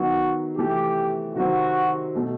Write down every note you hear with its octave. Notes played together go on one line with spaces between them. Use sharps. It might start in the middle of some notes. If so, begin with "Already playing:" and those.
Already playing: D#3 F#3 B3 D#4 F#4
C3 E3 A3 G4
C3 D#3 F#3 C4 F#4
B2 A3